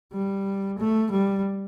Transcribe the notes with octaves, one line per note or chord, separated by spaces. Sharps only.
G3
A3
G3